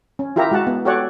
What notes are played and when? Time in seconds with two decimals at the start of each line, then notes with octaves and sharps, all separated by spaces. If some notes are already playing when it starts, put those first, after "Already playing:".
0.19 C#4
0.36 E4 F4 G4 A#4 E5 A#5
0.51 G#3 F#4 F#5 A5
0.67 B3
0.85 F#4 G4 A4 C#5 D5 F#5